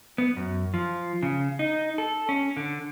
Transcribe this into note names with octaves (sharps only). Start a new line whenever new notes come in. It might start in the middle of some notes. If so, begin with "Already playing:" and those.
B3
F#2
F3
C#3
D#4
A4
C#4
D3